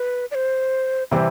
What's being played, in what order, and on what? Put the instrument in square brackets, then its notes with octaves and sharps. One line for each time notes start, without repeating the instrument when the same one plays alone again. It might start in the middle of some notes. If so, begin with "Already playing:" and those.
Already playing: [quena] B4
D5
C5
[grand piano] C3 E3 G3 C4 [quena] C5